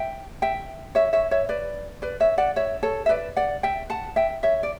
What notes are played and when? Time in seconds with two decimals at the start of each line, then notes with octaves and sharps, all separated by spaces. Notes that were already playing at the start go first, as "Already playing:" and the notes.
Already playing: E5 G5
0.42 E5 G5
0.95 C#5 E5
1.13 C#5 E5
1.31 C#5 E5
1.49 B4 D5
2.02 B4 D5
2.20 C#5 E5
2.38 D5 F#5
2.56 C#5 E5
2.83 A4 C#5
3.06 E5
3.09 B4 D5
3.36 D5 F#5
3.63 E5 G5
3.90 F#5 A5
4.16 E5 G5
4.43 C#5 E5
4.63 D5